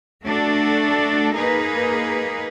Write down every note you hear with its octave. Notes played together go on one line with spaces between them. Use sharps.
A3 D4 F#4 A4
A#3 D#4 G#4 B4